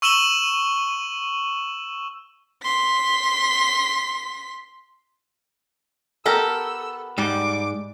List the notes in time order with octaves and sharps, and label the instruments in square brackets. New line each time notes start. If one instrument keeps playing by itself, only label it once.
[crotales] C#6 E6 D#7 E7 F#7 G7
[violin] C6 B6
[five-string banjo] B3 G4 A#4 [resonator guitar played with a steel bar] A4 [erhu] E6
[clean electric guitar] G#2 [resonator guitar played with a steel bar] G3 [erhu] D6